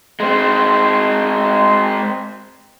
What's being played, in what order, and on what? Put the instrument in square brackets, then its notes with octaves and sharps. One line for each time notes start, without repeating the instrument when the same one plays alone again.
[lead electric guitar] G#3 C4